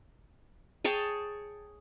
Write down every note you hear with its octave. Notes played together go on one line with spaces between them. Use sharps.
G#4 C#5 G5 A5